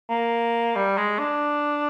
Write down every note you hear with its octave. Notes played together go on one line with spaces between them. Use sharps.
A#3
G3
G#3
D4